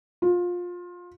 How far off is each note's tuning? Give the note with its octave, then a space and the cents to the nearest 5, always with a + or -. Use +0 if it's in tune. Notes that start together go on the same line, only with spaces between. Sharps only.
F4 +20